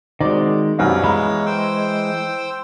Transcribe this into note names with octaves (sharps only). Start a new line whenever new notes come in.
D#3 G#3 C4 F#4 D5
C2 F#2 G3 B3 C#5 F5
E3 G#3 A#5 B5
C5 G5 E6